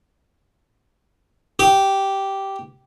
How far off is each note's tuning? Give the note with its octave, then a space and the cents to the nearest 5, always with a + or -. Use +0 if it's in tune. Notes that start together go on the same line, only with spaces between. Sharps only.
G4 -10